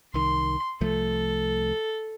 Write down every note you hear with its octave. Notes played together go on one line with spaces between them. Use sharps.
C2 D#3 C6
C2 F3 A3 A4